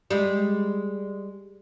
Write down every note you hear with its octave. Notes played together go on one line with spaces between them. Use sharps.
G3 G#3